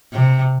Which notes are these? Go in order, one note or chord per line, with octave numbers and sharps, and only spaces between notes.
C3